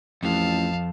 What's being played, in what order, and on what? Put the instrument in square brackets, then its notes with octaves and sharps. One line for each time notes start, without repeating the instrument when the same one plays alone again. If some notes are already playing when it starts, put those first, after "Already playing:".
[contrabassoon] A1 [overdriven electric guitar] F2 [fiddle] F5 A5